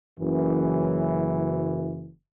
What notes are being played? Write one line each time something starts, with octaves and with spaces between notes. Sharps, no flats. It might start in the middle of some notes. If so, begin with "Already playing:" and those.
F#1 F#2 E3